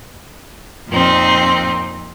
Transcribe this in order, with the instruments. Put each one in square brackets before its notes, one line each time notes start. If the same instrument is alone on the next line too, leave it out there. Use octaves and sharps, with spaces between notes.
[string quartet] F2 A#2 C4 D#4